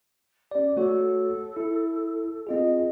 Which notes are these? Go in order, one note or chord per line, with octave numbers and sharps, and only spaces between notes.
C#4 G4 D5
A3 F#4 A4 C#5
E4
C4 F4 G#4 D#5